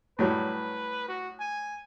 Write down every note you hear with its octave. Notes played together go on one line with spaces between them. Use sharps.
A2 F#3 G3 B4
F#4
G#5